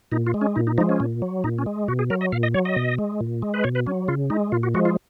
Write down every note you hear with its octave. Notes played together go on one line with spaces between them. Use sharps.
A#2 D#4
F4
G#3
C#4
A#2 D#4
D#4
F3 G#3 D#4
C#4
A#2
F#3
A#2 D#4
C#4
G#3
B2 F#4
G#4
F#3 A#4
D#5
A#2 F5
D#5
F#3 C#5
D#5
B2
G#3
A#2
G#3
B4
B2 C#5
B4
F#3 C#4
C#3 F4
G#3 D#4
A#2 F4
F#4
F3 G#3 F#4
F4